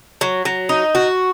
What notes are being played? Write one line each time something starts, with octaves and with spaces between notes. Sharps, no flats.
F#3
F#3
D#4
F#4